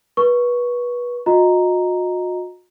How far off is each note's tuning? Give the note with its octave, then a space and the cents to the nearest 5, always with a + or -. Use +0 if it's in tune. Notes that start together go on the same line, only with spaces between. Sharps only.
B4 -25 C#6 +0
F#4 -40 D#5 +0 A#5 +0